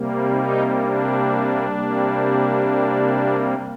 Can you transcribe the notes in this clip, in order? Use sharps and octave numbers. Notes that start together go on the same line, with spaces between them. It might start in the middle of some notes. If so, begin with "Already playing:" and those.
Already playing: C3 G3 A#3
D#4
D4
C3 G3 A#3